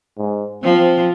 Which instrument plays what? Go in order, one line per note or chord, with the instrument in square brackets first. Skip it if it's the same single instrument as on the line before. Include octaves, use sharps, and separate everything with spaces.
[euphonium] G#2
[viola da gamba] F3 [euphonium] C4